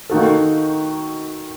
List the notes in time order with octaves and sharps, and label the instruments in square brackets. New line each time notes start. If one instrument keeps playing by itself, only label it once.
[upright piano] D#3 A#3 D#4 F#4 A4